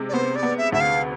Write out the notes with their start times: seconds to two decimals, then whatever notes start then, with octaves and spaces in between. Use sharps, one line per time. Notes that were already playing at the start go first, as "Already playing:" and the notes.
Already playing: C3 G#3
0.09 D5
0.13 B3 C5
0.35 D5
0.43 B3
0.58 E5
0.72 D2 E5
0.80 F5